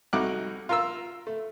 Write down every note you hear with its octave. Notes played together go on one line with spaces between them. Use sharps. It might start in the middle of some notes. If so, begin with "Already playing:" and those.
C2 A3 D#4 F#4 D6 F#6
F4 A#4 E6
A3